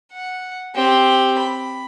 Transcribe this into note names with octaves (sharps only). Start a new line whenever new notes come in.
F#5
C4 G4
B5